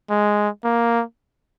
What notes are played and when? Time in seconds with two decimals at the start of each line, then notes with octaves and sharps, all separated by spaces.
0.10 G#3
0.64 A#3